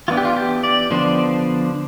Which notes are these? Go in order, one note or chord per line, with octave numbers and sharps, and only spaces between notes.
E3 B3 D4 F4
G4
F4
G4
D5
D3 F3 B3 D4 C5